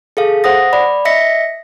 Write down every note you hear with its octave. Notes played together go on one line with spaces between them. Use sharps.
G#4 A4 F5
C5 F#5 D#6 A#6
D5 B5
D#5 E5 A#6 B6 C#7